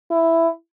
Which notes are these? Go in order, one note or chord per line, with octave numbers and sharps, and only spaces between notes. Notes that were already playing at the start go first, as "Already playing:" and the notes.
E4